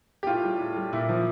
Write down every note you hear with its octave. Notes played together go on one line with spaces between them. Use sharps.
G4
A2 F4
G3
A2
G3
A#2 E4
F3